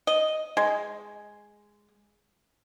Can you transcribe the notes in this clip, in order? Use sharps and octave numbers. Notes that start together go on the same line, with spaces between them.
D#5
G#3